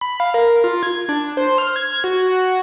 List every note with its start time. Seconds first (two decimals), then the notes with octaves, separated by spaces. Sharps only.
0.01 B5
0.20 F5
0.34 A#4
0.64 F4
0.83 G#6
1.09 D4
1.37 C5
1.58 F6
1.76 G#6
2.04 F#4